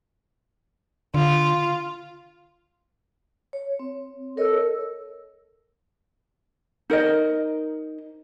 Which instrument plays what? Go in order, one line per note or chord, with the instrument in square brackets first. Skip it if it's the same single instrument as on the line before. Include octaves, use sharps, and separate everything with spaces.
[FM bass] D3 [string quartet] F4
[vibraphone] C#5
C4
[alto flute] A4 [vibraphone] A#4 C#5 D#5
[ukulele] D#4 A#4 C5 D#5